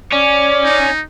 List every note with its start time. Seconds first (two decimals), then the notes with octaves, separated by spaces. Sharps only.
0.12 C#4 D5
0.64 D#4